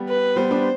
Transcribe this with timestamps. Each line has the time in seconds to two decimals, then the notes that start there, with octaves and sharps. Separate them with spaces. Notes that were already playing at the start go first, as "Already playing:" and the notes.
Already playing: G3 B3
0.08 B4
0.36 G3 B3 C5
0.51 B3 D4